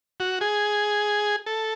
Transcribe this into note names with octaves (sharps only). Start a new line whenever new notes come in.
F#4
G#4
A4